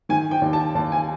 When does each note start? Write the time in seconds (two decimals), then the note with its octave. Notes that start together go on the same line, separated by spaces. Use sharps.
0.09 D#3 G#5
0.31 G5
0.42 D#2
0.53 A5
0.75 D#2 A5
0.92 G#5